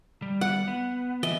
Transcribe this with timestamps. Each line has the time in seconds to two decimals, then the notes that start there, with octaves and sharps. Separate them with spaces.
0.22 G3
0.41 F#5
0.68 B3
1.23 E3 D#5 E5